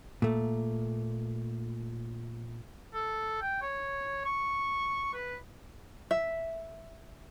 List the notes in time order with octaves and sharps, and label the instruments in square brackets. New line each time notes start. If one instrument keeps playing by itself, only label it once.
[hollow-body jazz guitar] A#2 A3
[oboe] A4
G5
C#5
C#6
B4
[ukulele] E5